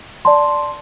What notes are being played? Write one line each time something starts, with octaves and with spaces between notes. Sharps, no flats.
D5 A5 C6